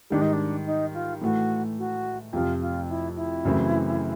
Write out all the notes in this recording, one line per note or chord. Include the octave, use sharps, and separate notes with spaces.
G#2 D#3 G3 D4
D#4
D4
D#4
F4
A2 E3 A3 F#4
F#4
F2 C3 F3 F4
F4
E4
E4
F#2 C#3 E3 A3 C4